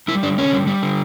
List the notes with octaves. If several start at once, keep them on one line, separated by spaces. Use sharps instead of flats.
G3 E4
D3 D4
D3 C#4
G3
G3
D3